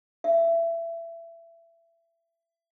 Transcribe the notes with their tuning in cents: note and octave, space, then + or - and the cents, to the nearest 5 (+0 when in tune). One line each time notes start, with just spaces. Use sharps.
E5 +25